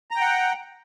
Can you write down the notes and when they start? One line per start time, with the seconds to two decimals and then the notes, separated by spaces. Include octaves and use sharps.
0.11 A#5
0.16 G5
0.21 F#5